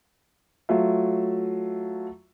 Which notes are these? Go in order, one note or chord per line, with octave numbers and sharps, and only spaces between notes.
F#3 A3 F4 E5